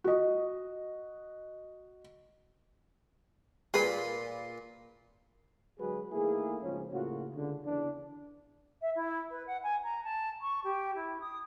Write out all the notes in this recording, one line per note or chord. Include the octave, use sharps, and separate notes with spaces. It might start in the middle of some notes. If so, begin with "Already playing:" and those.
F#4 D#5
A#2 G#4 B4 B5 C6
D3 F#3 G#3 F#4 G#4 B4
D#3 A3 A#3 E4 G#4
G#1 C#2 F3 C#4
A2 C#3 A#3 F4 F#4
C#2 D3
E2 C#3 E3 D4
E5
E4
B4
F#5
G#5
A#5
A5
C#6
G4
E4
D#6